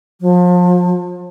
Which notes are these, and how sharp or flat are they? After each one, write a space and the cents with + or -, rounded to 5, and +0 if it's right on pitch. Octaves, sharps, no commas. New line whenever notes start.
F3 +35